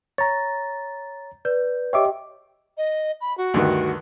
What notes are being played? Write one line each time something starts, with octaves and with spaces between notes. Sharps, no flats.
C#5 A#5 A6
B4 D5 G6
G4 C#5 D#5 E5 G5 D6
D#5
B5
F#4
D2 G2 D#3